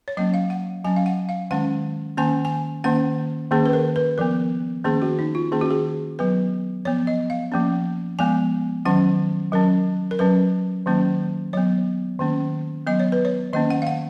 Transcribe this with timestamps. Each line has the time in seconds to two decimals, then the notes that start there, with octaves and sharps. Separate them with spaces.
0.08 C#5
0.17 F#3 A#3 C#4 D#5
0.34 F5
0.50 F#5
0.85 F#3 C#4 G#5
0.96 F5
1.06 F#5
1.29 F5
1.51 D#3 G#3 C#4 F#5
2.17 D#3 A#3 C#4 G#5
2.45 G#5
2.84 D#3 A#3 C#4 F#5
3.51 D#3 A#3 C#4 G#4
3.66 B4
3.73 A#4
3.96 B4
4.18 F3 B3 A#4
4.84 D#3 A#3 C#4 G#4
5.02 F#4
5.19 D#4
5.35 F4
5.52 D#3 A#3 C#4 G#4
5.61 F#4
5.71 G#4
6.19 F#3 B3 B4
6.85 F3 B3 C#5
7.07 D#5
7.30 F5
7.52 F3 A#3 C#4
8.19 F3 G#3 B3 G#5
8.85 D#3 F#3 C#4 F#5
9.52 F#3 C#4 A#4
10.11 A#4
10.19 F#3 C#4 B4
10.86 D#3 F#3 A#3 C#4
11.53 F#3 B3 C#5
12.19 D#3 A#3 C#4
12.87 F#3 B3 D#5
13.00 C#5
13.12 B4
13.25 C#5
13.53 D#3 A#3 C#4 D#5
13.70 F#5
13.82 F5
13.87 F#5